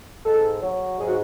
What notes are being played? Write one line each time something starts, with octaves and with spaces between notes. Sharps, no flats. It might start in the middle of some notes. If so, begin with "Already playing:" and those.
G#2 A4
F#3
G#2 G#4
F#4